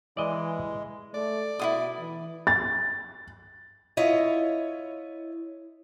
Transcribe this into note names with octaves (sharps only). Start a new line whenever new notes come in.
E3 G#3 D5 D#5
A3 D5
B2 E4 F4 D#6
E3
A6
E4 F4 C#5 D#5